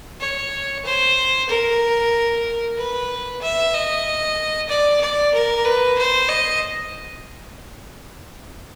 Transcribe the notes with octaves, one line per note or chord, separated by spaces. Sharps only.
C#5
C5
A#4
B4
E5
D#5
D5
D5
A#4
B4
C5
D#5